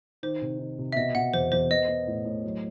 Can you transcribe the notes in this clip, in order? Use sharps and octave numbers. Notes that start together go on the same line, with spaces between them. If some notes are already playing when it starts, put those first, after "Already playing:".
D#3 C5
C3
D#3
C3
E5
B2 D#5
B2 F#5
E2 C5
E2 C5
B3 D#5
B3
A2
A2
F#3